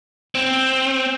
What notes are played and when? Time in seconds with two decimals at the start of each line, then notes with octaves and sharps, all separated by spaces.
0.35 C4